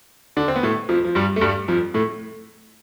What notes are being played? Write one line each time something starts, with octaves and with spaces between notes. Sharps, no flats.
D3 D4
C4
B3
A2 A3
F2 F3
F3
G2 G3
A3
G2 G3
F2 F3
A2 A3